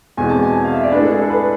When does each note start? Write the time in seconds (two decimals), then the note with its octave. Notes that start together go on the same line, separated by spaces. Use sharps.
0.17 E2 B2 G#3 C4 G#5
0.29 A5
0.43 G#5
0.55 G#5
0.64 F5
0.73 E5
0.84 D5
0.92 A2 G#3 D4 B4
1.02 A4
1.11 G#4
1.21 A4
1.30 B4